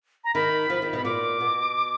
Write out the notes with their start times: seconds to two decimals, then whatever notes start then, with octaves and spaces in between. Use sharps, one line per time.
0.24 A#5
0.34 D#3 B5
0.70 F3
0.82 D#3
0.93 B2 B5
1.05 A#2 D6
1.40 B2